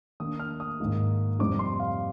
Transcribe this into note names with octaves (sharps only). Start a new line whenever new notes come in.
D#3 A#3 D4 D#6
F6
D#6
G#2 D#3 A#3 D#4
F2 C3 G3 C4 D#4 D6
C6
F5